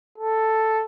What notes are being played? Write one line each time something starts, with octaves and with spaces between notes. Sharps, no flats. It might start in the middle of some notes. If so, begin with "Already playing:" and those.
A4